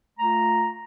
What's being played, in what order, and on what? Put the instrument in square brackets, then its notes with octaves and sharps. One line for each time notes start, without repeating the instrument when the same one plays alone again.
[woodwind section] A3 F4 A#5